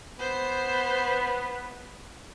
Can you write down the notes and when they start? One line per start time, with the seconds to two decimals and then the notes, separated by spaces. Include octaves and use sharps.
0.19 B3 C5